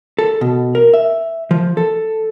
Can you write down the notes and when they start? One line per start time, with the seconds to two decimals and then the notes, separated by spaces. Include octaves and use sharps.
0.19 A4
0.41 B2
0.75 A#4
0.94 E5
1.51 F3
1.77 A4